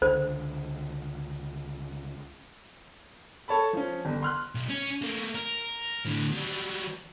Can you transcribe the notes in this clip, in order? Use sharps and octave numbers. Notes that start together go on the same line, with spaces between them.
C#2 D3 C5
A4 C#5 A5 B5
F3 C#4
G1
C6 F6 F#6
B1
C#4
A3 A#3
A#4
A2 D3
F#3 G3